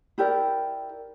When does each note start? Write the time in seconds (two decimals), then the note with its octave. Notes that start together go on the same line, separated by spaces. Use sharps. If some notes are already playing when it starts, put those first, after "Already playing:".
0.18 E4 G4 A#4 D5